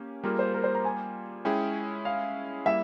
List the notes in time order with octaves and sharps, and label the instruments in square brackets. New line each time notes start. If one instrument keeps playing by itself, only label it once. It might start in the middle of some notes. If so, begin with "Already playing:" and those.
Already playing: [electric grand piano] A#3 C#4 G4
[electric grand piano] G3 A#3 F4 G#4 [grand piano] A#4
[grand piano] C5
A#4
C5
A#5
G#5
[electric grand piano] G#3 C#4 E4 G#4 [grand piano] G5
[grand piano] F5
[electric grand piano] G3 A#3 E4 [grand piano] E5